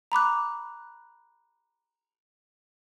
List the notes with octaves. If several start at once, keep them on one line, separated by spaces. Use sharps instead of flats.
A#5 B5 D6 F#6